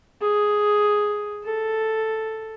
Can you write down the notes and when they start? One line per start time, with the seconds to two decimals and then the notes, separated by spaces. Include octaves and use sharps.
0.21 G#4
1.45 A4